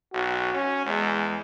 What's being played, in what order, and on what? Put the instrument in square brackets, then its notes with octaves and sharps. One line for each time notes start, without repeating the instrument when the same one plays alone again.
[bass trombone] B1 [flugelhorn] F#4
[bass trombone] C#4
[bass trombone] E2 [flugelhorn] G#3